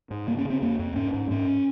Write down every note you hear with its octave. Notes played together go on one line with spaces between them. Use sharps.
G#2
C#3 A#3
C#4
C#3 C4
F2 A#3
F2
G#2 C#4
G#2
G#2 C#4